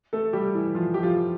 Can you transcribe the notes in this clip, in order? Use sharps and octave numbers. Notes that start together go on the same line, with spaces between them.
A3 A4
G3 G4
E3 E4
F3 F4
G4
F3 F4